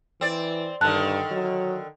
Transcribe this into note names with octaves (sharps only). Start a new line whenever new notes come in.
E3 C4 D5
G2 D3 D#3 A5 F#6
F#3